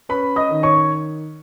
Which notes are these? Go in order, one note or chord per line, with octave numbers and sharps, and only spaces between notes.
C#4 B4 B5
D#5 D#6
D#3
C#5 C#6